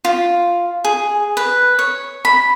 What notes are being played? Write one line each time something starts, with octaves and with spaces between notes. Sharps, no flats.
F4
G#4
B4
C#5
B5